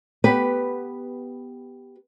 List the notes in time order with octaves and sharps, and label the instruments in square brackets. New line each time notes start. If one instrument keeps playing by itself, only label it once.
[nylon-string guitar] B3 G4 B4